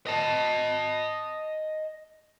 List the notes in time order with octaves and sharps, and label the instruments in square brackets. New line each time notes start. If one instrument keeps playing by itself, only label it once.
[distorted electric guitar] D#5 A5